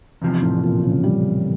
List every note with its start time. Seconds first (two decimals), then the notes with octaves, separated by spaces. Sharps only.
0.22 E2 C3 F3
0.42 A2
0.63 A#2
0.84 C#3
1.04 G3